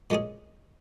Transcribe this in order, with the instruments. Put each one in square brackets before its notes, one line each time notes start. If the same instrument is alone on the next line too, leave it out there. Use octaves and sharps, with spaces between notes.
[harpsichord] A#2 G#3 C#4 G#4